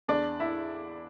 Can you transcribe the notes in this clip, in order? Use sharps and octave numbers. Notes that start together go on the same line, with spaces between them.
E2 D4 D5
E4 E5